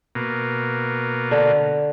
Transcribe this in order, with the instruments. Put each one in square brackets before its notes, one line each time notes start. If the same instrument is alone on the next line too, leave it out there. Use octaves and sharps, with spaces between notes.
[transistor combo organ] B2 A#3
[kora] D3